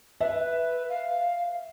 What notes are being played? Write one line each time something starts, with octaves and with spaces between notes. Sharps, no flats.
B4 E5
F5